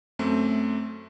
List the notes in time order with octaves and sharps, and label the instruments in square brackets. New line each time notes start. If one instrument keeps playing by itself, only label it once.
[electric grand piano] F#2 A3 C4